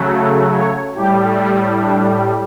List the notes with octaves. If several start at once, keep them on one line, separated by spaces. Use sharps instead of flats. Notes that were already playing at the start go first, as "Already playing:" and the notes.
Already playing: C#3 F#3 A3
A4
C#5
A2 G3 G4
D4